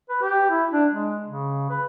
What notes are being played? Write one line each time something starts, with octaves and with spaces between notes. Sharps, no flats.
B4
G4
E4
D4
G#3
C#3
B4